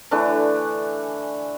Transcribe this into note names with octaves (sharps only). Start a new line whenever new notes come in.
D3 E3 A3 D4